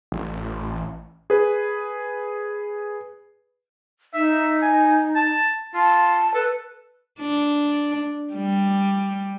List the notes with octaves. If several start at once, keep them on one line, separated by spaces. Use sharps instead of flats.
A1
G#4 B4
D#4 E5
G#5
A5
F4 A5
A4 B4
D4
G3